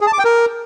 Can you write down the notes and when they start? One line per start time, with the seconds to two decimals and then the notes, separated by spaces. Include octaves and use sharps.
0.01 G#4
0.07 A5
0.13 D6
0.19 G5
0.25 A#4